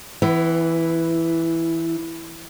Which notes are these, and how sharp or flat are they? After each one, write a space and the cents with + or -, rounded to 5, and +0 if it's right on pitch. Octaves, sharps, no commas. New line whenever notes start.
E3 +0 B3 +45